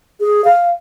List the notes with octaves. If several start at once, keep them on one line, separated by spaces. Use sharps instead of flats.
G#4
F5